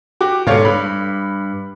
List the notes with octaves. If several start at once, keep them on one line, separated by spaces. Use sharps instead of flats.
F#4 G4 D6
G#2 B2 A4 C#5 F5
G2 B5